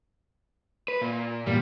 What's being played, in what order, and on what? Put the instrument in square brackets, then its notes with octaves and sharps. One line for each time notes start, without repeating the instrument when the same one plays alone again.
[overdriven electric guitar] B4
A#2
[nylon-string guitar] E2 A#2 E3 [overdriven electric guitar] G3